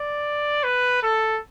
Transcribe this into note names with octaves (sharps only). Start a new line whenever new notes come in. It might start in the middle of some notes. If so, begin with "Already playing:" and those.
Already playing: D5
B4
A4